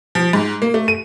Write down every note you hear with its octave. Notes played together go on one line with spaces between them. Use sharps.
F3
G#2
A#3
A3
D#7